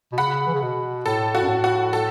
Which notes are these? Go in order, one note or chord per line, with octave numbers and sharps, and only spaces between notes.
B2
C#3 F#5 B5
E3
C#3
B2
A2 A4
F#4
F#2
A2
F#4
A4